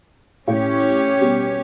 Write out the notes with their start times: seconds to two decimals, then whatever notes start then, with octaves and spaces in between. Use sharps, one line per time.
0.47 A2 C#4 G4 C#5
1.21 B2 G3